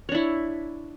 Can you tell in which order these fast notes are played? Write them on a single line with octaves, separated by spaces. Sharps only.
C#5 D4 E4